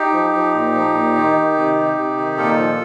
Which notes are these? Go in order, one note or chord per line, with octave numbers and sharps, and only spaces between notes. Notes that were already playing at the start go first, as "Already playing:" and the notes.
Already playing: D#4 G4
F3
F3
A#2
F3
A#2
D#3
D#3
C3
C3
C3
D#3
A#2 F4 A4
F3